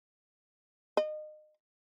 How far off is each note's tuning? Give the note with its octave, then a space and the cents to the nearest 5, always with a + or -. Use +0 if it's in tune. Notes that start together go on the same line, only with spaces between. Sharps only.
D#5 -30